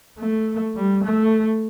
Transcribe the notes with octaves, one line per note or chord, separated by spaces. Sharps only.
A3
G3
A3